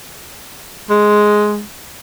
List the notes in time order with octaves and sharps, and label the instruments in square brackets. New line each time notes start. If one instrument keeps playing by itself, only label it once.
[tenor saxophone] G#3